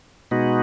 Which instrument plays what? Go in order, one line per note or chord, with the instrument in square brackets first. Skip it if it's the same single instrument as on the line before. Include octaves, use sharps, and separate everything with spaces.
[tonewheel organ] B2 G#3 B3 D#4 F#4